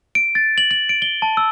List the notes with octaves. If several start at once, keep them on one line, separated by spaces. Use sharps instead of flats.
D7
A6
F#7
F#7
D7
G7
A5
E6